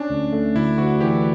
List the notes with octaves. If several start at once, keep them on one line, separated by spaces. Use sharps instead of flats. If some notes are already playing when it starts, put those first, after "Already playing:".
Already playing: C#4 D4
D2
A3
D2 E4
D2 F#4
E3 G4